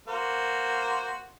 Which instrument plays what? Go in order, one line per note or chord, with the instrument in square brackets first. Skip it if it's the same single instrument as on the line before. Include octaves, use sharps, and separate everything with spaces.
[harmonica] A#3 F#4 C5